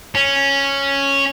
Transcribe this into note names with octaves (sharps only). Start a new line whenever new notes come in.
C#4